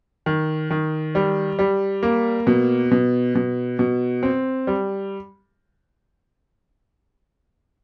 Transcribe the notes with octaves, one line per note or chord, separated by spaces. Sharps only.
D#3
D#3
G3
G3
A#3
B2
B2
B2
B2
C4
G3